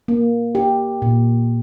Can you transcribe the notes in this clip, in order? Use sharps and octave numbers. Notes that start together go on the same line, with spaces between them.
A#3
G4
A#2